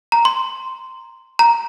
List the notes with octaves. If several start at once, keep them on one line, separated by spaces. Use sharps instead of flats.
A#5
C6
A#5